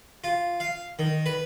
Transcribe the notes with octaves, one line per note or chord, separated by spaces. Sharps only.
F4
F5
D#3
B4